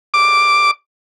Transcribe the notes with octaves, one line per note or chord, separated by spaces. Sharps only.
D6